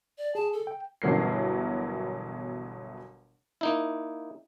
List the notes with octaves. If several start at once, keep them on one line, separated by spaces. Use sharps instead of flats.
D5
G#4 A5
A4
G5
G1 B2 E3 F#3 A#4 C7
A#3 D#4 E4